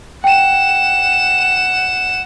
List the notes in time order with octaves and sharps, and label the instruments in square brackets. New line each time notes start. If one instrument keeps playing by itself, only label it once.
[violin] F#5 E7 [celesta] G5